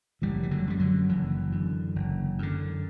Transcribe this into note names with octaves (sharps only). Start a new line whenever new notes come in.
F#1 E3 G3
E3
D3 F#3
F#2 D3 G3
D3 F#3
F#1 E3
F#2 D3
F#1
F#2 D3